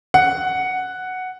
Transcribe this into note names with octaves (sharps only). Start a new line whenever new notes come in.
F#5